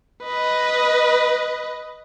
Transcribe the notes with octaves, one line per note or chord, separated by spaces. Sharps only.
B4 D#5